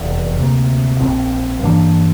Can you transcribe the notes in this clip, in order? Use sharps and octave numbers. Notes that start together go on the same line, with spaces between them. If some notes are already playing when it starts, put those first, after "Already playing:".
Already playing: F1 E2 E3
D2 C3 G3 A#3
A#1 A#2 F3 C4
G2 E3 A#3 D4